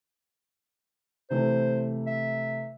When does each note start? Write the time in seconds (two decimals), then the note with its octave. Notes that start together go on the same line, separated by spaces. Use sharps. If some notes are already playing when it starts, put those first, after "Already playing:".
1.30 C3 E3 A3 C5
2.07 E5